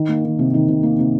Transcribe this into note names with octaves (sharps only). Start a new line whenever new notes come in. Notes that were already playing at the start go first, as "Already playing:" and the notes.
Already playing: D#3
A#3
D#3
C3
D#3
C3
A#3
C3